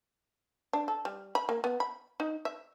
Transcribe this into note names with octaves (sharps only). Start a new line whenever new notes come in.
D4
A4
G3
B5
A#3
B3
B5
D#4
E5